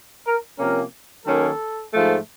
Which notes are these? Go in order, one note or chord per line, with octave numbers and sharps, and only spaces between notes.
A#4
C3 F3 A#3 C#4 A#4
D#3 F#3 A#3 C#4 A4
G#2 F3 A3